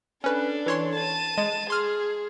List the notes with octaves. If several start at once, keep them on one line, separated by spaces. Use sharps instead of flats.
C#4 D4 A4 B4
E3 C#5 C6
A5 D#7
G#3
G#4 C6 F6